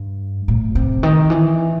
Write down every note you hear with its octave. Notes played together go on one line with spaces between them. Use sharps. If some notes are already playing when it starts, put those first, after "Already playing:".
Already playing: G2
A2
C3
D#3
E3